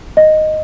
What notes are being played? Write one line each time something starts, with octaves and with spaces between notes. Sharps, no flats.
D#5